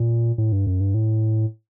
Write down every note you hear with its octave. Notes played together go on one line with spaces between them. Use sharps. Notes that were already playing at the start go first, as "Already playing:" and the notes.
Already playing: A#2
A2
G2
F#2
G2
A2